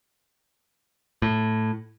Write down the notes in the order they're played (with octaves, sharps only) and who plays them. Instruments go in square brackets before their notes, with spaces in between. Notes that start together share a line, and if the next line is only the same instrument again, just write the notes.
[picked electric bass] A2